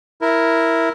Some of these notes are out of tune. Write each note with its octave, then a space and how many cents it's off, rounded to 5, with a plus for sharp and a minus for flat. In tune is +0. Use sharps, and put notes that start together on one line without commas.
E4 +0 A#4 +0